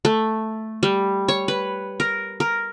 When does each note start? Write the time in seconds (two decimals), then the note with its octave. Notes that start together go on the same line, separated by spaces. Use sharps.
0.05 A3
0.83 G3
1.28 C#5
1.48 B4
2.00 A#4
2.40 A#4